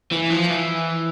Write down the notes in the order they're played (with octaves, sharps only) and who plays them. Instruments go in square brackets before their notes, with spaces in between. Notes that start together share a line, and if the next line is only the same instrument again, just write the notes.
[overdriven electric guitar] E3
F3
E3